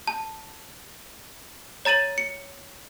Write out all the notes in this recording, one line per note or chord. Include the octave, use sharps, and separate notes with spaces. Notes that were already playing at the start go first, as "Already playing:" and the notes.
A5
C#5 A#5 A6 D#7 F#7
C#7